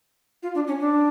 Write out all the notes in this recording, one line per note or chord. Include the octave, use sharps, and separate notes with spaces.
F4
D4
C#4
D4